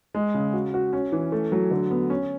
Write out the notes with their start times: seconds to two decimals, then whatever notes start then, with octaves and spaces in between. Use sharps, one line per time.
0.14 G#3
0.34 C#3
0.53 F#4
0.74 F#4
0.93 C#4
1.12 E3
1.32 A3
1.52 F#3
1.71 D3
1.90 B3
2.10 C#4